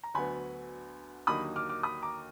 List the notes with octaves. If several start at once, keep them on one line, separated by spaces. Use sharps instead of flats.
A#5
D2 D3 F#3 B3 G#5 B5
D#2 D3 F#3 A#3 D#4 B5 D#6
D6 F6
D6 F6
B5 D#6
A#5 D6